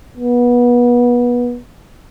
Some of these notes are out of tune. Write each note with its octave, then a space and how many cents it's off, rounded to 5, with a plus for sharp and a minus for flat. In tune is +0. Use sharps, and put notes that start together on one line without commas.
B3 -25